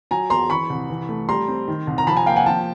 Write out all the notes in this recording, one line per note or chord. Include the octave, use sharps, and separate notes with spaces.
F#3 G#5 A#5
E2 A#5 C6
E3 B5 C#6
C2
E3
A3
G3 A#5 C6
C4
D#3
C2
A#5
F3 A5 B5
G#5 A#5
A#3 F5 G5
F#5 G#5
F3 G5 A5